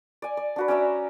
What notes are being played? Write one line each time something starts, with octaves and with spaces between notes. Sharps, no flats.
D5 G#5
D5
D4 F#4 B4
C#4 D5 E5 A#5